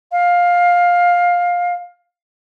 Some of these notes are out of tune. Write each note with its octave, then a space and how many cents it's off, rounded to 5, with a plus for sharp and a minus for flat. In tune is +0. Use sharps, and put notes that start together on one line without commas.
F5 +15